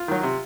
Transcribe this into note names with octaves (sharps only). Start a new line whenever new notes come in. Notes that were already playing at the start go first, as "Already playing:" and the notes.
Already playing: F4
D#3 F#3
C3